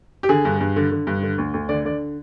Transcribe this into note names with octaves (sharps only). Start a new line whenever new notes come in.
G4
D3 G#4
G2
G2
D3
D3
G2
D3
D2
D2
D3 D5
D3 D5